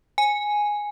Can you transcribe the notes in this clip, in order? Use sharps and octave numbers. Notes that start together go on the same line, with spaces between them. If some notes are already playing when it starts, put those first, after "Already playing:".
G#5